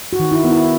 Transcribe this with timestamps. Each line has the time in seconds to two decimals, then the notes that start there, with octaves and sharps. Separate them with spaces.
0.13 F#4
0.20 D#3
0.32 E4
0.44 B3
0.51 E4